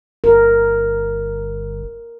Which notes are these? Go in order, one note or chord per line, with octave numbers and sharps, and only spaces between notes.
G1 A#4